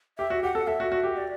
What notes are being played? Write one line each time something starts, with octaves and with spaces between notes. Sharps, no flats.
G4 E5
F#4
G4 F#5
A4
A4 E5
F#4
F#4
G4
D5